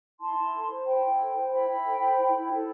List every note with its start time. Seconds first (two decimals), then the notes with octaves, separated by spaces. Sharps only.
0.19 E4 A5 C6
0.36 E4
0.52 A4
0.69 C5
0.85 E4 G5 B5
1.02 E4
1.17 A4
1.34 C5
1.50 E4 G5 B5
1.67 E4
1.83 A4
1.99 C5
2.16 E4
2.32 E4
2.49 A4